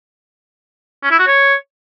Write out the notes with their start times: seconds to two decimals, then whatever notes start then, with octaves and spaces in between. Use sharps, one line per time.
1.03 C#4
1.11 E4
1.19 F#4
1.27 C#5